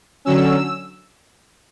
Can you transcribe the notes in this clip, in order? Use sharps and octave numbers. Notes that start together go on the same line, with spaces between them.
D3 F#3 C#4 E6